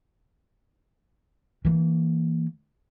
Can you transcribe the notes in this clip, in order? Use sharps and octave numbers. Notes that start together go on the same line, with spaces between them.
E3 A#3